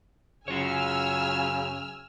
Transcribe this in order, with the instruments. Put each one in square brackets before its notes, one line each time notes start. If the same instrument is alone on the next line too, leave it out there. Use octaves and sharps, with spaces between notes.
[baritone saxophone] F#2 [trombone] C#3 [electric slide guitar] F4 C#5 [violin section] G#5 E6 F6